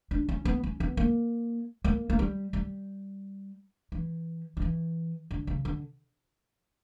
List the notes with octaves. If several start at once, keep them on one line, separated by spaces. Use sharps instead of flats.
D4
C#4
B3
C#4
B3
A#3
A#3
A#3
G3
G3
E3
F#3
E3
D3
C#3
D3